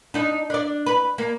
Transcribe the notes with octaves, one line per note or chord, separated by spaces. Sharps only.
D4 D#4
D4 D5
B4
A#3